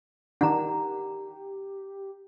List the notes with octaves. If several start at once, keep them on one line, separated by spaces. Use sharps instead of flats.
D#3 D4 G4 F#5 A#5